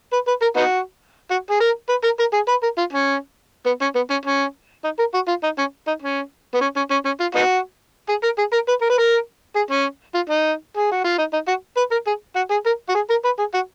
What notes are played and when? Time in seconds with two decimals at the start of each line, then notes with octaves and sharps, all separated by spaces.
0.13 B4
0.28 B4
0.42 A#4
0.56 B3 D#4 F#4
1.31 F#4
1.51 G#4
1.60 A#4
1.89 B4
2.04 A#4
2.19 A#4
2.34 G#4
2.48 B4
2.63 A#4
2.78 F4
2.93 C#4
3.66 B3
3.82 C#4
3.95 B3
4.10 C#4
4.25 C#4
4.84 D#4
4.99 A#4
5.14 F#4
5.28 F4
5.43 D#4
5.58 C#4
5.87 D#4
6.02 C#4
6.54 B3
6.61 C#4
6.76 C#4
6.91 C#4
7.05 C#4
7.20 F4
7.35 B3 D#4 F#4
8.09 G#4
8.23 A#4
8.38 G#4
8.53 A#4
8.68 B4
8.82 A#4
8.90 B4
8.98 A#4
9.56 G#4
9.71 C#4
10.15 F4
10.30 D#4
10.77 G#4
10.92 F#4
11.04 F4
11.18 D#4
11.33 D#4
11.48 F#4
11.77 B4
11.91 A#4
12.07 G#4
12.36 F#4
12.51 G#4
12.66 A#4
12.89 F#4
12.95 G#4
13.10 A#4
13.25 B4
13.39 G#4
13.54 F#4